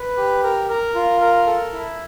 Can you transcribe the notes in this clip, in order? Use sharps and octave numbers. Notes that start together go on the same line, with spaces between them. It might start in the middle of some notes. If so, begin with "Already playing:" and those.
Already playing: B4
G4
A#4
A#4
F4
A#4
A4
E4